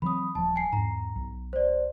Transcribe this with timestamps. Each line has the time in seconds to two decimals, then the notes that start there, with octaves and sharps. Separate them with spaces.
0.02 E3 F#3 C4 B5 D#6
0.35 D#1 F3 A5
0.56 G#5 C7
0.73 E2 G#2 A#5
1.16 B1
1.53 C5 D5